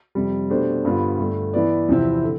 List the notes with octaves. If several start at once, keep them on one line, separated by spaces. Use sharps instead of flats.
F2 C3 G3
B2 A3 D4 G4 C5
G2 D3 G3 B3 F4
G2 D3 A3
E3 B3 E4 B4 D5
E2 C3 F3 C4 E4
D3